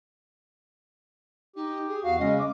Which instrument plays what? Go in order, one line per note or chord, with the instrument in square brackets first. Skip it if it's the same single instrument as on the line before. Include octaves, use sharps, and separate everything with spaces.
[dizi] D#4 [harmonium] G4
[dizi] G#4
[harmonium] E2 F#4 [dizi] F5
[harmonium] C#3 G#3 C#4 [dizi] D#5
[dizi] D6